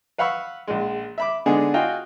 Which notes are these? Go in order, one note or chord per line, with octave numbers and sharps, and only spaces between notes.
B4 F5 F#5 B5 C#6 E6
A#1 G#3
E5 B5 D6
D3 G#3 B3 D4 D#4 G#4
F4 F#4 D#5 F5 G5 G#5